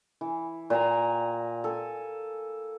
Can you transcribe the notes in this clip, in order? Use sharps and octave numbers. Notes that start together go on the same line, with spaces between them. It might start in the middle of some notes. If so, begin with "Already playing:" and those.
E3
A#2 G5 G#5 A#5
A4 G#5